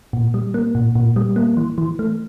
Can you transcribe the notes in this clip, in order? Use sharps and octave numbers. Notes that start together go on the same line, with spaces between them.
A#2
G3
A#3
A#2
A#2
G3
A#3
E3
E3
A3